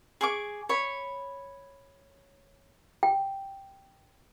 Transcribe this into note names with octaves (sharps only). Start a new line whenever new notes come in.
G#4 C#6 D6
C#5 B5
G5